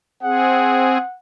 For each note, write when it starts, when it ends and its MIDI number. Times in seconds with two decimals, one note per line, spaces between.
0.23 0.98 60
0.23 0.98 68
0.23 1.17 78